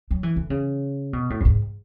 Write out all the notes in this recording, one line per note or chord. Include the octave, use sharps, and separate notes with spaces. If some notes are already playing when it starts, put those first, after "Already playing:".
F#3
E3
D3
C#3
B2
A2
F#2
G#2